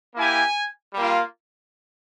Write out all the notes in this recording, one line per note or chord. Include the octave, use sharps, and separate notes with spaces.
A#3 E4 G4 G#5
G3 A#3 F4